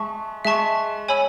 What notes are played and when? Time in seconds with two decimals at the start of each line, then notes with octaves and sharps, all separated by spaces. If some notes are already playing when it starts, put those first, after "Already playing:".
Already playing: G#3 E5 A5 C#6
0.45 G#3 E5 A5 C#6
1.08 C#5 G#5 B5 E6